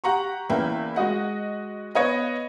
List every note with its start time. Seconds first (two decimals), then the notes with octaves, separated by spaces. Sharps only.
0.04 G4 F#5 A#5 C#6
0.49 E2 A#3 C#4 B4 E5 G5
0.96 G#3 F#4 D#5 F#5
1.95 B3 B4 C#5 D#5 F5